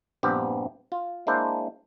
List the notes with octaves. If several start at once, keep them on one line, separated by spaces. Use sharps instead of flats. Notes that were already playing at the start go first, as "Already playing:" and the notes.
A#1 G2 B3 C4 G4
F4
G#3 A#3 D4 E4 C5